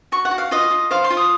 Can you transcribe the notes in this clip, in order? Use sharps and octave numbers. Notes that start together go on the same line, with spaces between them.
F#4 C#6
F#5
F#4
F5
F4 D#5
F4
C5 F5
C6
F4
D#6